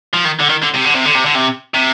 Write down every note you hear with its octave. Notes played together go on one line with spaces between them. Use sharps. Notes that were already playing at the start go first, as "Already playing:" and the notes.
F3
D#3
D3
D#3
D3
C3
D3
C3
D3
C3
D3
C3
C3